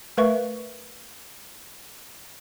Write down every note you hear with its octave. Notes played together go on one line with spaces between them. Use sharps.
A3 A#4 B4 E5 F5 C#6